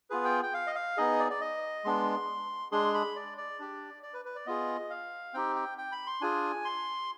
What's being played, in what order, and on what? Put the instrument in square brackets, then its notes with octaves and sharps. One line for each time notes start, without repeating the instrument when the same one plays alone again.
[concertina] B3 F4 G#4 B4
G5
G5
F5
D#5
F5
B3 D#4 G#4 D#5
D5
D5
D#5
G#3 B3 D4 C6
G#3 D4 G#4 C6
B5
D5
D5
D4 G4
D5
B4
B4
D5
B3 F4 G#4 D#5
F5
C4 D#4 G4 G5
G5
G5
B5
C6
D4 F4 G#4 G#5
C6